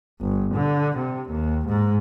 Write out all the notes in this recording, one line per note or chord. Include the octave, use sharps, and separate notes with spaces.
G1
D3
C3
D#2
G#2